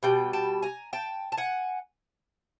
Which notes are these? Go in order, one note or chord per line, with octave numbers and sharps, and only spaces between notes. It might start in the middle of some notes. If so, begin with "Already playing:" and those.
B2 G3 G5
G5 A5
G#5 A#5
G5 A5
A5
F#5 G#5